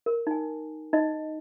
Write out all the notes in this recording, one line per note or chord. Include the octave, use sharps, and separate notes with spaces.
A#4
D#4 G#5
D#4 D#5